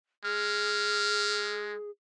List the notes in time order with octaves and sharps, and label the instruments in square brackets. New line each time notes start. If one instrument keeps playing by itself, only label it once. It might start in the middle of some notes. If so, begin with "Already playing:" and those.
[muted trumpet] G#3 [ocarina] G#4 [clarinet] F6